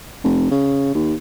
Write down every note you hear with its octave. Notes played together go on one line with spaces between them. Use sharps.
F1
C#3
D#2